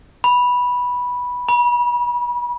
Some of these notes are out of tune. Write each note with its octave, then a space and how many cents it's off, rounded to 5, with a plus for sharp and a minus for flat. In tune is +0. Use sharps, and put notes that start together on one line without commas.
B5 -10
B5 -35